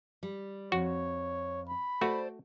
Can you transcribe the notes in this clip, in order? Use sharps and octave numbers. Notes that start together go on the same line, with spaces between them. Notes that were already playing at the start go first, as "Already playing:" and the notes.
G3
F2 F#4 C#5
B5
A3 F#4 A4 C5 D5